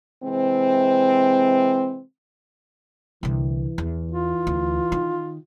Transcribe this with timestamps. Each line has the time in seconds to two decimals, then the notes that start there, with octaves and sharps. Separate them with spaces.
0.23 C3 E3 G#3 C4
3.23 C2 D3 E3
3.78 E2
4.11 F4
4.47 D2
4.92 D#3